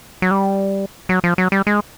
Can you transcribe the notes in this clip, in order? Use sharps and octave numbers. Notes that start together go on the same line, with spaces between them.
F#3
G3
F#3
F3
F#3
G3
G#3